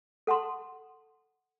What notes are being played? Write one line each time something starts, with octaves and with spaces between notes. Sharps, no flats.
A4 F#5 A5 C6